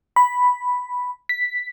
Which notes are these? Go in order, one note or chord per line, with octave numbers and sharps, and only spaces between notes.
B5
B6